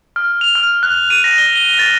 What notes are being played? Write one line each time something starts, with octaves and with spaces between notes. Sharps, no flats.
F6
F7
F6
F#6
D#7
A#6
G7
G7
A6